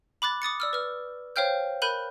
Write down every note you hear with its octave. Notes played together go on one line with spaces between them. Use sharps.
B5 D6 F#6 A6
D6 D#6 A6 C#7
D5 E6 F6
B4 F6
C5 C#5 F5 G5 F6 G6
A#4 B5 F#6 G6 D#7 F#7